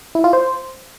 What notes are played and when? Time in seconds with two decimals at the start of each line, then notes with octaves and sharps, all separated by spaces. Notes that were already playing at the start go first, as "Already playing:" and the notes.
0.15 E4
0.24 F4
0.33 C5